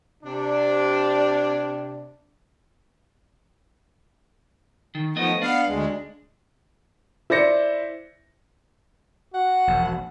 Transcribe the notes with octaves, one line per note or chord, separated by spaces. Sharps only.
C3 D4
D#3
D#3 F3 A3 B3 D#5
B3 D4 F5
D2 G#3
E4 C5 D5 A#6 C#7
F#4 F#5
E1 A#1